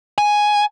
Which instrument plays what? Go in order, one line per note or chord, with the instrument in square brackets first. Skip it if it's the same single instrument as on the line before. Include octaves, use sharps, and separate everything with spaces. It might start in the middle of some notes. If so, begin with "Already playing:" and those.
[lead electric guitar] G#5